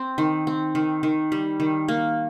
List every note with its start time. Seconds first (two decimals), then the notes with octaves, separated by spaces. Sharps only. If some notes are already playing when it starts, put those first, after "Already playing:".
Already playing: C4
0.18 D#3
0.47 C4
0.75 D#3
1.03 D#3
1.32 G3
1.60 D#3
1.88 A#3